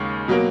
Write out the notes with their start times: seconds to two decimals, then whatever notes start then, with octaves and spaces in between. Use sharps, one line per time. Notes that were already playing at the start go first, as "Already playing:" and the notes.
Already playing: D#2 C#3 G#3 C#6
0.28 B2 F#3 A#3